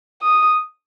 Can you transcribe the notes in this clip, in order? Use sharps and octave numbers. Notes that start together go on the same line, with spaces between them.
D#6